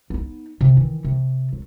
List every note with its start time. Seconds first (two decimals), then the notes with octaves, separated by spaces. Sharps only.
0.10 B3 D#4
0.61 C3
0.77 D#3 E3
1.04 C3
1.53 F#3